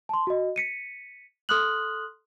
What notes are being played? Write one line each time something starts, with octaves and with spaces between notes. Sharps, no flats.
A5 C6
F#4 D#5
B6 C#7 D#7
A4 C6 D#6 F6 F#6 F#7